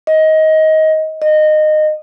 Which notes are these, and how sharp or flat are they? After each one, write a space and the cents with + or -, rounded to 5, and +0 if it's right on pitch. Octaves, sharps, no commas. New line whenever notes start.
D#5 +20
D#5 -20